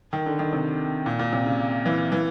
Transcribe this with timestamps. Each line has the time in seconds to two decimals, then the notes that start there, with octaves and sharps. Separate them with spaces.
0.13 D#3
0.26 D3
0.39 D#3
0.53 C3
1.06 A#2
1.19 A#2
1.33 C3
1.46 C#3
1.86 E3
2.12 E3